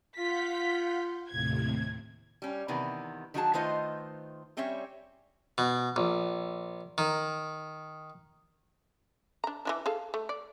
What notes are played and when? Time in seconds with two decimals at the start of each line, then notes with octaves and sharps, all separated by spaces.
0.18 F4 F5 F#5 G6 B6
1.30 D#2 A2 C3 G#6
2.42 G3 C#4
2.68 C3 D#3 E3 B3
3.34 D#3 F#3 D4 F#4 G#4 A5
3.54 D#3 A3 F4 B4 C5 D#5
4.57 G3 C4 C#4 C#5 E5
5.58 B2
5.96 A#1
6.98 D#3
9.44 D4 A#5
9.65 E3 F#3 D4
9.86 G#4 A4 F5
10.14 A3
10.29 D5